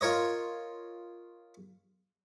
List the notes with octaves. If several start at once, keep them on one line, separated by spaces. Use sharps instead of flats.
F4 A#4 C#5 D#5